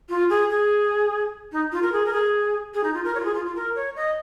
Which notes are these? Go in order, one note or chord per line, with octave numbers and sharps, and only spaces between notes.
F4
G#4
G#4
D#4
F4
A#4
G#4
A#4
G#4
G#4
D#4
F4
A#4
C#5
F4
G#4
F4
F4
A#4
C#5
D#5